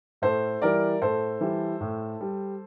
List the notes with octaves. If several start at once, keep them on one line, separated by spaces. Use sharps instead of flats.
A2 A4 C5
E3 G3 A#4 D5
A2 A4 C5
E3 G3
A2
G3